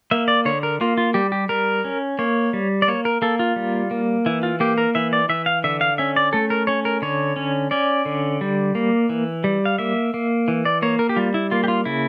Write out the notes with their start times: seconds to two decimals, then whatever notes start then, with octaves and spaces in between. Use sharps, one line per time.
0.11 A#3 E5
0.28 D5
0.45 D3 C#5
0.63 A#4
0.81 A#3 F4
0.98 F4
1.14 G3 G4
1.32 G4
1.49 G3 A#4
1.84 C#4
2.19 A#3 C#5
2.53 G3
2.82 D5
2.88 A#3 C#5
3.05 A#4
3.22 A#3 A4
3.39 F4
3.56 G3
3.91 A#3
4.26 E3 E4
4.43 F4
4.60 A#3 G4
4.78 A#4
4.95 E3 E5
5.13 D5
5.29 E3 E5
5.46 F5
5.64 D3 E5
5.81 F5
5.98 C#4 E5
6.16 D5
6.33 A3 A4
6.50 A#4
6.67 C#4 C#5
6.85 A#4
7.02 D3 C#5
7.36 C#4
7.71 C#4 D5
8.05 D3
8.41 G3
8.75 A#3
9.09 E3
9.44 G3
9.65 F5
9.78 A#3 E5
10.14 A#3
10.48 E3
10.65 D5
10.82 A#3 C#5
10.99 A#4
11.09 G4
11.16 G3 F4
11.34 E4
11.51 A#3 F4
11.64 G4
11.68 F4
11.85 C#3 E4